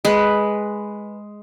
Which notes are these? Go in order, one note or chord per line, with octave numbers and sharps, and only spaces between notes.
G#3 B4